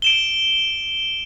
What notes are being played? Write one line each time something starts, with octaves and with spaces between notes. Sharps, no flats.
D7 E7 G7